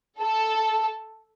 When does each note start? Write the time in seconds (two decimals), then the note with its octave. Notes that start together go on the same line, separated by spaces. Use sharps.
0.21 A4